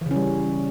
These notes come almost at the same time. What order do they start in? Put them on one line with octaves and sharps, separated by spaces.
E3 C#3 C#4 G3